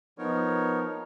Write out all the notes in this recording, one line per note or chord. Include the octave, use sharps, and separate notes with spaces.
F3 B3 D#4 A#4 C#5